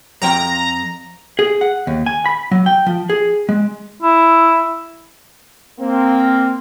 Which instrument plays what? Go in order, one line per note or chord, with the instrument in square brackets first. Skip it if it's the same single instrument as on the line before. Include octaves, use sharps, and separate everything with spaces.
[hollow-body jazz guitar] F2 F3 G5 [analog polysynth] A#5
[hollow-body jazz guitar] G#4
F#5
D#2
G#5
B5
F#3
G5
F3
G#4
G#3
[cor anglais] E4
[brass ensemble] A#3 C4